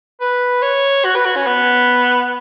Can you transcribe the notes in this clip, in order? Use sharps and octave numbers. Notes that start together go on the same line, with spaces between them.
B4
C#5
F#4
B4
F#4
C#4
B3